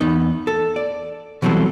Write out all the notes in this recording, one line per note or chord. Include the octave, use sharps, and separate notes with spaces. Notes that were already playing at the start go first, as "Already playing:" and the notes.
E2 B3 D#4
A4
D5
B2 E3 F#3 G3 C4 A4